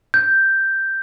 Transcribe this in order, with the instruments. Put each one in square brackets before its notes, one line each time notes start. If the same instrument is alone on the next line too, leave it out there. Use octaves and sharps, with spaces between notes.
[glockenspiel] G6